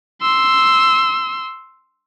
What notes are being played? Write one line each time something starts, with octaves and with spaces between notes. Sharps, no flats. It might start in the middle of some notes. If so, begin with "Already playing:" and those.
C6 E6